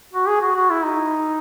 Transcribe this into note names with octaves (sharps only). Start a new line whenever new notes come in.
F#4
G#4
F#4
F#4
E4
D#4